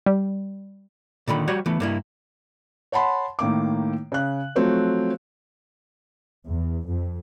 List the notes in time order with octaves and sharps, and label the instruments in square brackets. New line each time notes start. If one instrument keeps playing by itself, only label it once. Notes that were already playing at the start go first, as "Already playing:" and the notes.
[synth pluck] G3
[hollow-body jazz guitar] A#2 D3 D#3 B5
G3 F#4 G4 C#5
E3 A3 B3
G2 A#3 E4
[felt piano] C#5 F#5 A5 B5 C6
A2 D#3 A#3 D6
C#3 F#6
F3 F#3 A3 C4 C#5
[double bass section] E2
F2